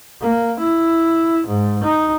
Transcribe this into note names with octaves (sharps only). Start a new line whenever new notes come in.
A#3
E4
G#2
D#4